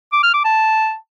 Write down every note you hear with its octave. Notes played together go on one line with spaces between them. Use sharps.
D6
F6
D6
A5